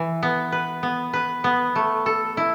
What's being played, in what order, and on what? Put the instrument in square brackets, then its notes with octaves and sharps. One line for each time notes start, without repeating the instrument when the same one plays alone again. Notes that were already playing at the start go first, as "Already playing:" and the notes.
Already playing: [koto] E3
B3
B4
B3
B4
B3
A3
A4
E4